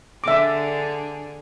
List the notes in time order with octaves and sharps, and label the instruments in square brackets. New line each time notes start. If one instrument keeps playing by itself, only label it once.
[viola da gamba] D3 D4 G#4 [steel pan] E5 D6